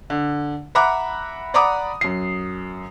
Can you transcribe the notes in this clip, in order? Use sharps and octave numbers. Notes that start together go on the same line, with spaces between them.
D3
E5 F#5 A#5 B5 D6 F#6
D5 F#5 A#5 B5 D6 D#6
F#2 C7